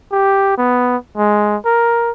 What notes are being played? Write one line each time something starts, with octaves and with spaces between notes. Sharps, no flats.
G4
B3
G#3
A#4